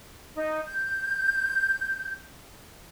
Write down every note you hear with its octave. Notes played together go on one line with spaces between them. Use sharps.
D#4
G6